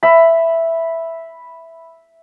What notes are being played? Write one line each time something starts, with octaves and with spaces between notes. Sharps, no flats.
E5 B5